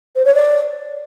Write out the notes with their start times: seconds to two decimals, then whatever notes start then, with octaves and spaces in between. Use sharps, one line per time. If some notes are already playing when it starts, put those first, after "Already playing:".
0.15 C5
0.25 C#5
0.34 D5